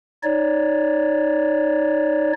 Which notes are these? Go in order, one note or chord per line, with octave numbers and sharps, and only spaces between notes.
D#4 C#5 D5